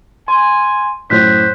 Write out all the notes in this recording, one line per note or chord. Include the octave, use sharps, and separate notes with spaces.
G#5 C6
F#2 A2 C5 F#6 B6